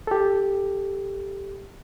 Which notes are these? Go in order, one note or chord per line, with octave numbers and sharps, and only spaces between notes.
G4 A4